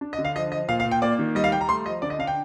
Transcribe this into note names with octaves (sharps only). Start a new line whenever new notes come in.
D4
D#5
D3
F5
F3 D#5
F3 D#5
A#2 F5
F5
A#2
G5
A#3 D5
D#3
G3 D#5
F5
G3 G5
A#5
A3 C6
F3 D#5
D3 D5
D#5
D4 F5
G5